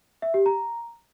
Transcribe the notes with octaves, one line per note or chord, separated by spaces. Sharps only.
E5
G4
A#5